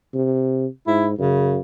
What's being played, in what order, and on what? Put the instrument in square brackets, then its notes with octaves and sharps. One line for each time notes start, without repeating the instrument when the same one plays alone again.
[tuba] C3
[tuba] G#2 [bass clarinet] E4
[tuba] F#2 [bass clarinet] C#3